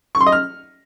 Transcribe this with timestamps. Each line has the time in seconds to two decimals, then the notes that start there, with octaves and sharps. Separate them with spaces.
0.15 C#6
0.21 C6
0.27 D#5
0.32 F6